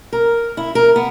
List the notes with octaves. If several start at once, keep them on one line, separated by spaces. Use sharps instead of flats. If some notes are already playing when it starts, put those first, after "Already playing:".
A#4
E4
A#4
B3